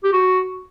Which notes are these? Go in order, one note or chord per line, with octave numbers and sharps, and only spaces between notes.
G4
F#4